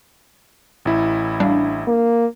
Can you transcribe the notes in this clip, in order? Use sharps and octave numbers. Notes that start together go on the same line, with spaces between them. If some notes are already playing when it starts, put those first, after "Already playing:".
A1 E4
G3 D4 F5
A#3